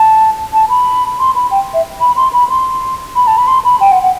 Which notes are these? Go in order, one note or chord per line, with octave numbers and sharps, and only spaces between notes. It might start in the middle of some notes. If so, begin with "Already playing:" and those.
Already playing: A5
A5
B5
C6
B5
G5
E5
B5
C6
B5
C6
B5
A5
B5
C6
B5
G5
F#5
F#5